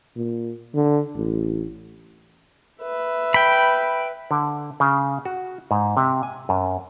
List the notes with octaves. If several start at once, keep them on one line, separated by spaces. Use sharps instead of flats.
A#2
D3
A1
B4 E5
G5 B5
D3
C#3
F#4
G#2
C3
G#5
F#2